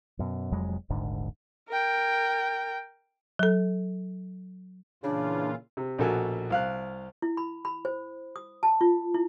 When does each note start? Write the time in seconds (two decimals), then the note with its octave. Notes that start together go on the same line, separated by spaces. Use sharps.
0.19 F#2 B2
0.52 F1 F2 F#3 G#3
0.90 D#1 G#1 G#2 D3
1.69 A#4 G5
3.39 F#3 A4
5.03 A#2 C#3 E3 D4 F4
5.77 C3
5.98 A#1 B2 F#4 A4 A#4 G#5
6.50 C2 F5 F#6
7.22 E4
7.37 B5
7.65 B5
7.85 C5
8.36 D#6
8.63 A5
8.81 F4
9.14 E4